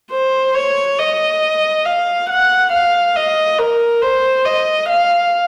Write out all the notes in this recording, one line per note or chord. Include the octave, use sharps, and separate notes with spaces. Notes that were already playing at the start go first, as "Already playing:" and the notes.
C5
C#5
D#5
F5
F#5
F5
D#5
A#4
C5
D#5
F5